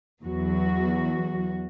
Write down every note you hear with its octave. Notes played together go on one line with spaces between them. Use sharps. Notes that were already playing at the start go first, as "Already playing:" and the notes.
E2 F#3 F#4